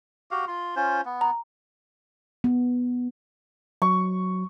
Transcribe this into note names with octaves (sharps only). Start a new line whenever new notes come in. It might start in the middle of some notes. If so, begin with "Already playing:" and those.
F#4 G4 F5
F4 C6
C#4 F4 C5
B3
A#5
B3
F#3 C#6